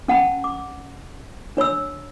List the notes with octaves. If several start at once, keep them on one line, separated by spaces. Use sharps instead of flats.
C#4 F#5 A5 B5
D6
D4 C#5 B5 E6